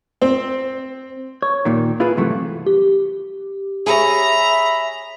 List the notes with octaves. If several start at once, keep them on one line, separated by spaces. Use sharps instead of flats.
C4
C#5
D#2 A#2 D#3
E4 F4 G#4 B4
G2 C3 E3 F#3 A3
G4
G#4 C#5 E5 A#5 B5